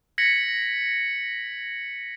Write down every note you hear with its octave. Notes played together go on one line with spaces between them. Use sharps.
G#6 A#6 B6 C#7 F#7